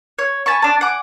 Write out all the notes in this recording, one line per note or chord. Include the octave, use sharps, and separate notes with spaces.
C#5
G#5 A5 B5 C#6
D4 A5
F#5 G#5 D6